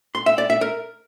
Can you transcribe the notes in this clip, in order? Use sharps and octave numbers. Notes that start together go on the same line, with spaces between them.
C6
E5
D5
E5
A#4